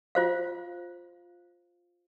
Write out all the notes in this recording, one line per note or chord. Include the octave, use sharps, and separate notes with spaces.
F4 C5 F5